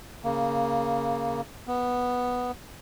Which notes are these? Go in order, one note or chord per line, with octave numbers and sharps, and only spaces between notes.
C#3 A#3
B3